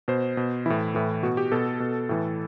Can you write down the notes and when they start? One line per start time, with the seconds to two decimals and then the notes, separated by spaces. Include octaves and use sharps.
0.08 B2 C5
0.37 B2
0.66 A2 E3 E4
0.94 A2 E3
1.23 B2 F#4
1.37 G4
1.52 B2 A4
1.80 B2
2.09 A2 E3